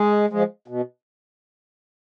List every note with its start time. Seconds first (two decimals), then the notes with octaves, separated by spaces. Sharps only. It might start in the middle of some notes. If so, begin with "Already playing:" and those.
Already playing: G#3
0.30 F3 G#3
0.68 B2